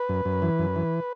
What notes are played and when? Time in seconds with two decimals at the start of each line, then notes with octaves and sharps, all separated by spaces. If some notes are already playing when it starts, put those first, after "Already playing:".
Already playing: B4
0.09 F#2
0.25 F#2
0.42 E3
0.59 F#2
0.76 E3